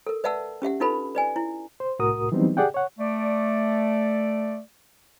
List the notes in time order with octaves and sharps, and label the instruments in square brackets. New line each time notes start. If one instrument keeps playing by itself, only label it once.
[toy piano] A4 A#4
B4 D5 E5 F#5 A5 E6
C#4 G4 E5 F#5
D4 D#4 F4 A4 B4 B5
B4 D5 G#5
E4
[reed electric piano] C5
C2 A2 F#4 A#4 D#6
E3 F#3 G3 B3 C4 D#4
G4 G#4 D5 F#5 G5
C#5 F#5
[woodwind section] A3 D5